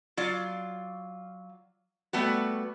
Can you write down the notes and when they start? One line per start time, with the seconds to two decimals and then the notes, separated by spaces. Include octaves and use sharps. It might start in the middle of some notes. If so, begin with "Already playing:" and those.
0.17 F#3 F4 D5
2.13 G3 A3 B3 F#4